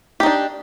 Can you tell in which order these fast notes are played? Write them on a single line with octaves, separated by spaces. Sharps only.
G4 D#4 D4